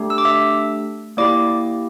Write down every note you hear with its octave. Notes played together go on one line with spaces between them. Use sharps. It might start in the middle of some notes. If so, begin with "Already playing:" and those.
Already playing: A3 D4 G4
E6
D6
E5 E6
A#3 E4 G4 D5 D6